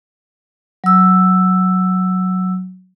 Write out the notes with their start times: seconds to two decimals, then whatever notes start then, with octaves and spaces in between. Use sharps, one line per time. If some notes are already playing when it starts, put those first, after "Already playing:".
0.84 F#3 E6